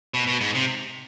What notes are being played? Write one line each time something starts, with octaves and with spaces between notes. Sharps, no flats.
B2
B2
G#2
C3